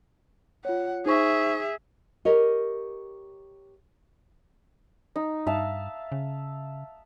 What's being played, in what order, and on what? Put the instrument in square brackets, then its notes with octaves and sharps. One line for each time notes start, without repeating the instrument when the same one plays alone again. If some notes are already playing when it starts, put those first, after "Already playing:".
[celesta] F4 C#5 [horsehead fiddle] F#5
[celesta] D#4 C5 C#6 [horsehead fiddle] G#4 E5
[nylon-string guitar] G4 A#4 C#5 D#5
[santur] D#4
[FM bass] G2 [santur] E5 F5 A5
[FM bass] C#3